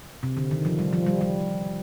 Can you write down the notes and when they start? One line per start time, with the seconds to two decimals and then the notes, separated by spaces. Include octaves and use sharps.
0.23 C3
0.37 D3
0.51 D#3
0.65 F3
0.79 G3
0.93 F3
1.06 G3
1.21 G3